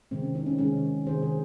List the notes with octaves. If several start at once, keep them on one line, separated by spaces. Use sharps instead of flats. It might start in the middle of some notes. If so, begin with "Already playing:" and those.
C3 D#3 G#3 C4
C#4
C4 D#4
C#4
C3 D#3 G#3 C#4
C3 D#3 G#3 G#4 C5
G#4 C5